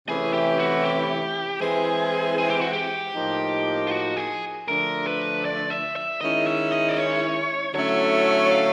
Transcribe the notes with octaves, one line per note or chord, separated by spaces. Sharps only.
C3 E3 A3 C#4 E4 G#4
G4
F#4
G4
E3 G#3 C4 E4 G#4
G#4
G4
F#4
G4
A2 F3 A#3 D#4
F4
F#4
G#4
D3 F3 A3 D4 A#4
B4
D5
E5
E5
D#3 G#3 C#4 E4 D#5
E5
D#5
D5
C#5
D3 F#3 A3 C#4 E4 C#5
F5